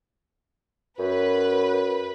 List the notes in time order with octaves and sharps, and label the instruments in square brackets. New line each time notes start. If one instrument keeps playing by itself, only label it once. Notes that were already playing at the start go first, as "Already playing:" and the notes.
[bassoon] F#2 [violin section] B4